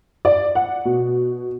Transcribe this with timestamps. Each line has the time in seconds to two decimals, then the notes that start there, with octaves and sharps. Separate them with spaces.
0.25 D5
0.55 F#5
0.85 B2